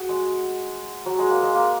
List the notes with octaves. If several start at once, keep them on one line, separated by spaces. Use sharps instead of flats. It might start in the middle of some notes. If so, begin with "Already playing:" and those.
Already playing: F#4 G#4
G#3
F#3
G#3
A#3
G#3
A#3